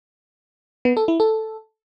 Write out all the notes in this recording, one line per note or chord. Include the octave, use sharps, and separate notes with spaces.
B3
A4
E4
A4